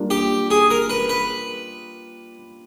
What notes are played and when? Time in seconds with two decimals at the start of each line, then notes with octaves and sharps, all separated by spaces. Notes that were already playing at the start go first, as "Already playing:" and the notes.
Already playing: G3 A#3 D4 F4
0.10 G4
0.50 G#4
0.70 A#4
0.90 B4
1.09 B4